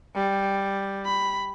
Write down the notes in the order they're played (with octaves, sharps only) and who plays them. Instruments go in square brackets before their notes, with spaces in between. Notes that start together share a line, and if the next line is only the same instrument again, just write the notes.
[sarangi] G3
[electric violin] B5